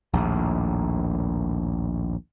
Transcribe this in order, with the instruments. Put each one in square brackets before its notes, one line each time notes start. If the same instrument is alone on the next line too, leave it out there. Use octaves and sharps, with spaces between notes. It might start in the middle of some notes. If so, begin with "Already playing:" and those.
[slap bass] A#1 D#2 A2